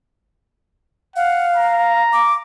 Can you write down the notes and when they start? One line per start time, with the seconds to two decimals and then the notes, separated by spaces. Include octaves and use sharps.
1.16 F5 F#5
1.56 A#5
2.13 D6